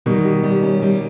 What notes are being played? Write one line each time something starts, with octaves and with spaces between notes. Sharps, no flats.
B2 D#3 G3
G4
G3
C#4
G3